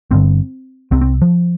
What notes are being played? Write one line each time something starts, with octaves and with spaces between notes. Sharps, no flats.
G1 G2 D3 C4
C2 C3 C4
C4
F3